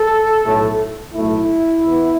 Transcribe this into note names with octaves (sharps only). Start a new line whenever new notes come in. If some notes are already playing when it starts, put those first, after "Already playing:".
Already playing: A4
B1 A2 A3
B1 A2 A3 E4
E2 E3 B3